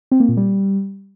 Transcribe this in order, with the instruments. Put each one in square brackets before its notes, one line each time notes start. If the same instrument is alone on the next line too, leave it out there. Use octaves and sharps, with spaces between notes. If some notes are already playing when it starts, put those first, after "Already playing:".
[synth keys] C4
A#3
A#2
G3